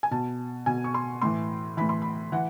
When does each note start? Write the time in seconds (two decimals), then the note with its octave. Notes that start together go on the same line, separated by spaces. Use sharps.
0.03 G#5
0.11 B2 A5
0.66 B2 G#5
0.84 C#6
0.94 C6
1.22 A2 E3 C6
1.77 A2 E3 B5
1.89 C6
2.02 B5
2.32 E3 F#5